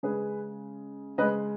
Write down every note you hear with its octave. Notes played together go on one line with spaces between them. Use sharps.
C#3 G#3 G#4 B4
C#3 G#3 B4 D#5